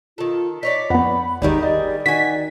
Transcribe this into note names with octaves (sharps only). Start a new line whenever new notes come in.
D#3 F4 A4
D#4 C#5 D5 B6
F2 B3 F#5 B5
G#1 D#2 D#3 G3 D#4 G#4 D5
D5 D#5
D#3 F#4 G#5 B6